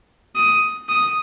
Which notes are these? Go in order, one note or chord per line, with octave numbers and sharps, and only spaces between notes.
D#6
D#6